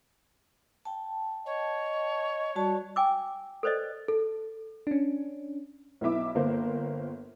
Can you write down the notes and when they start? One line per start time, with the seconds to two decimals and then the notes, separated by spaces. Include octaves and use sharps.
0.85 G5 A5
1.46 C#5 D#5
2.56 G3 F#4 D5 A5
2.96 G5 G#5 D6 E6
3.63 A4 B4 C5 D5 D#5
4.08 A4
4.87 C#4 D4
6.01 B1 B3 E4 E5 D6
6.35 G1 A#3 A#4 C5